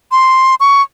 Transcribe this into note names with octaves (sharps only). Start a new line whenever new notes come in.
C6
C#6